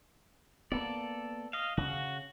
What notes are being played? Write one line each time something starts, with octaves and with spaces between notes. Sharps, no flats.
A#3 B3 A4 D5
D#5 F5
C#3 F#4